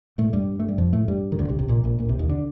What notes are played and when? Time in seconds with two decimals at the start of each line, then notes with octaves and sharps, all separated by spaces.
0.18 A2 A3
0.33 G2 G3
0.59 A3
0.68 G3
0.78 F2 F3
0.93 A2 A3
1.08 G2 G3
1.32 D#3
1.39 D2 D3
1.49 C2 C3
1.59 C2 C3
1.68 A#1 A#2
1.84 A#1 A#2
1.99 A#1 A#2
2.09 C2 C3
2.19 D#2 D#3
2.29 D3